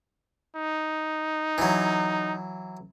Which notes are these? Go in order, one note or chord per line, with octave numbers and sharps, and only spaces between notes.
D#4
E3 F#3